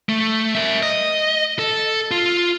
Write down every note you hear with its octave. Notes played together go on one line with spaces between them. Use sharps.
A3
A#4 E5
D#5
A4
F4